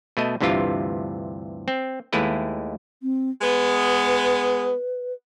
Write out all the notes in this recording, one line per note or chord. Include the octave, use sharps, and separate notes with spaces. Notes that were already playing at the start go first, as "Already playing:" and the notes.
B2 A3 D#5
D2 G2 C3 E3 F4
C4
D#2 G#3 A3 E4 B4 D#5
C4
G#3 B3 B4